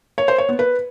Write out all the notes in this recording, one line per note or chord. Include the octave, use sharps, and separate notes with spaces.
C#5
C5
C#5
B3
B4